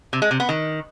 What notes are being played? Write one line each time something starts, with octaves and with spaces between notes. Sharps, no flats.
C3
G#3
C3
B3
D#3